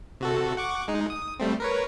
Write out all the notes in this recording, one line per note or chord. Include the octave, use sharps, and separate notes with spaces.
C3 F#4 A4
F#5 C#6 D6
G#3 D#4
D#6
G3 A3 C4
A#4 B4 C#5